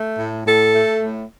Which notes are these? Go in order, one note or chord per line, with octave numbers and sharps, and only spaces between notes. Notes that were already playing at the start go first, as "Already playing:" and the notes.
Already playing: A3
A2
A2 A4
A3
A2